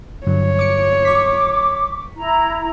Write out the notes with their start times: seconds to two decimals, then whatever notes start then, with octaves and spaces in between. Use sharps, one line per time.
0.27 G2 D3 F#3 C#5
0.59 D6 C#7
1.05 C#6 D6 B6
2.17 E4 A#5